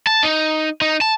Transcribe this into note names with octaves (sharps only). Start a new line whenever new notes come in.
A5
D#4
D#4
A5